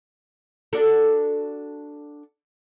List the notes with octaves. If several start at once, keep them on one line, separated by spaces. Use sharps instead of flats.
D4 F#4 A4